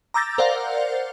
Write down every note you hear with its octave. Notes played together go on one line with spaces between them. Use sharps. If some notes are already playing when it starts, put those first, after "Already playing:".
A#5 D6 E6 G6 A6 A#6
A#4 C5 D5 F5 F#5